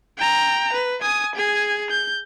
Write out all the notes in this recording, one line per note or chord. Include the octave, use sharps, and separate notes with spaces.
G5 A#5
B4
G#5 D#6
G#4 G#5
G6